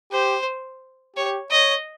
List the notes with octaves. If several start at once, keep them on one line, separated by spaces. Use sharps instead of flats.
G4 C5
G4 C#5
C#5 D#5